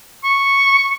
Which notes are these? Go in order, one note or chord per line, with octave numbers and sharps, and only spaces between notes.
C#6